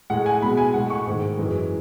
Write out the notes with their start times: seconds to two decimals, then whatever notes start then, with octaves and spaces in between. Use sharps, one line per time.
0.10 A2 G#3 F#5
0.26 G#5
0.42 B2 G#3 B5
0.57 G#5
0.74 A2 G#3 F#5
0.90 C#6
1.06 G#2 D#3 G#3
1.38 F#2 E3 G#3